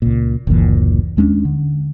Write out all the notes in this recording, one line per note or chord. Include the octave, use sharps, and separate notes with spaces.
C#2 A#2
F#1 D2 A#2 E3
D#2 G#3 C#4 D4
D3